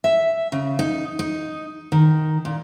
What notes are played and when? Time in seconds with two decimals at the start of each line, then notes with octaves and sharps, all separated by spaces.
0.04 E5
0.52 C#3
0.79 D#4
1.19 D#4
1.92 D#3
2.45 A#2